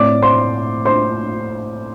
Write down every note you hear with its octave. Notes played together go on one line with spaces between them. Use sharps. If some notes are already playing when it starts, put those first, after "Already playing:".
Already playing: A2 A3 C4 D5 D6
C5 C6
C5 C6